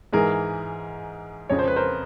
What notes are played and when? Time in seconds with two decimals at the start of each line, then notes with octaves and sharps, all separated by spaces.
0.13 G#2 E3 G#4 A#4
1.49 F2 C#3 F3 C#5
1.59 C5
1.68 B4
1.76 A#4 C5